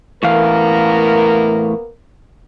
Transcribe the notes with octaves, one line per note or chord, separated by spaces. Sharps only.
A2 E3 A#3 B3 A#4 F5